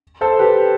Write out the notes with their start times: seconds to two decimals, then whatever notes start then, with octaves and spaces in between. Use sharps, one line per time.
0.21 A4 C5
0.39 G4 B4